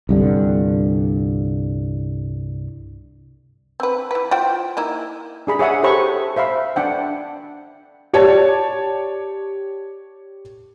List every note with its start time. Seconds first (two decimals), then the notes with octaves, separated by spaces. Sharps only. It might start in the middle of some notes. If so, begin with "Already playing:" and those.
0.09 C2 G2 D3
3.80 C4 B4
4.11 E3 B4
4.31 F4 C5 G5
4.77 A#3 D#4 E4
5.47 D4 G#4 B5
5.59 G#4 C#5 E5 F#5 D#6
5.83 G4 A4 C5 C#5 B5 C#6
6.36 C5 E5 F5 B5
6.76 D4 F#5 G5
8.13 G4 C#5 D5 A5